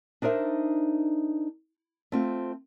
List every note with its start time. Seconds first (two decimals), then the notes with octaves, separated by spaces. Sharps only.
0.22 D4 D#4 A#4 C5 E5
2.12 A3 C4 F4